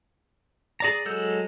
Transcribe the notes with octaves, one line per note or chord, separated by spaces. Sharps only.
G#4 D5 A#5
F#3 G#3 A4 E6 G6